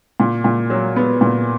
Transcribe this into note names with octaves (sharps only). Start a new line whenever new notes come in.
A#2
A#2
F#3
B3
A#2